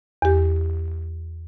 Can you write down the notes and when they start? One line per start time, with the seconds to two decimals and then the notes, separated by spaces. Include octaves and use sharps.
0.22 E2 G4